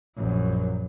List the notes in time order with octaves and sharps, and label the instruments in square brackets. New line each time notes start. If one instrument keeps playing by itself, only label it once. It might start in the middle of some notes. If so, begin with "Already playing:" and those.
[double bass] A#1 F#2